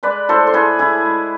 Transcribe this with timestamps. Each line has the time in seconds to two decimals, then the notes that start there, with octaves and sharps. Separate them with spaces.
0.03 G#3 B4 D5
0.29 A2 A4 C5
0.47 C5
0.53 A2 G#4 B4
0.79 G#3 E4 G#4
1.05 G#3